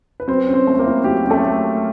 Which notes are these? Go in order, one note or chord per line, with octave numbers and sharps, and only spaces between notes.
B4
F#3 C4 C5
C#4
C4 C5
A3
A#3 A#4
E4
F#3 G4
C#4
A3 A4